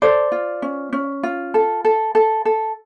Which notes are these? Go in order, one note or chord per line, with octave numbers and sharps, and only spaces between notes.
A4 C5 D5
F4
C#4
C#4
F4
A4
A4
A4
A4